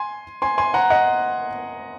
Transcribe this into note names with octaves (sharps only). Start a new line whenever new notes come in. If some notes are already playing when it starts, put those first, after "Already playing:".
Already playing: G#5 C6
G#5 C6
G#5 C6
F#5 A#5
D#5 F#5